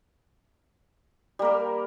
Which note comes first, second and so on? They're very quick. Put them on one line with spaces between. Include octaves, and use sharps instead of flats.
G3 A#3 A#4